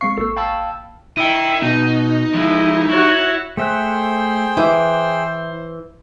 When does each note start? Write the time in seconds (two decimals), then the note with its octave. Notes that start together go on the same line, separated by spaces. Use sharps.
0.01 G#3 C4 F5 C#6 C7
0.18 A1 A#3 A4 E6
0.37 F5 G5 A5 B5 E6
1.17 E4 D#5 G5
1.62 B2 D#4
2.34 F3 G#3 E4
2.90 E4 F#4 C#5
3.57 A3 G#4 C5 E5 G5 F#6
4.57 E3 E4 B4 D6